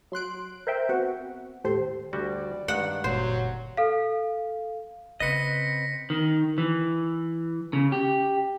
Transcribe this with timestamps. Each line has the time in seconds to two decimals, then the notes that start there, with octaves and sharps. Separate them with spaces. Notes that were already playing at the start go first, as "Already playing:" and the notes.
0.12 F#3 C6 F#6 D7
0.67 A#4 C5 E5 G5
0.89 B3 C4 F#4 F#5
1.64 D#2 A2 G4 A4 C5 C6
2.13 D2 G3 F#4 D5
2.68 G2 D#3 G#3 F#5
3.04 F#1 A#2 F#3 A#3 C5
3.77 A4 F5
5.20 C#3 C4 B4 D#5 A#6 B6 C#7
6.10 D#3
6.58 E3
7.73 C#3
7.92 G4